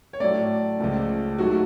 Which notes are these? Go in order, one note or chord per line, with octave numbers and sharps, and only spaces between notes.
C#5
A2 F#3 A3 D5
C#2 C#3 F3 A3
G#2 F#3 A3 F#4